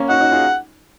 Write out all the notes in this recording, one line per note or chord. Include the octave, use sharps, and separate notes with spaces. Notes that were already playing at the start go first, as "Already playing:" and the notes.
Already playing: A#3 C#4
D#4 F#4 F#5
D#4 F#4
F4 G#4